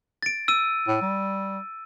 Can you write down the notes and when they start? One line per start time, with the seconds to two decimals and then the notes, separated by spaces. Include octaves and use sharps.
0.23 A6 D7
0.48 E6 D#7
0.88 A2
1.02 G3